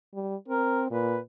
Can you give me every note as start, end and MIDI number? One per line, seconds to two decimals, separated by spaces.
0.14 0.36 55
0.48 0.87 60
0.48 0.83 70
0.91 1.19 46
0.91 1.19 71